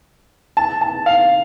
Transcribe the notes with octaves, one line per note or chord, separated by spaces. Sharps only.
A5
A5
F5